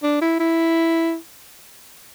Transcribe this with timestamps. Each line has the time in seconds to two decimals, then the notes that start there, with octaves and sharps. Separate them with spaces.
0.03 D4
0.22 E4
0.40 E4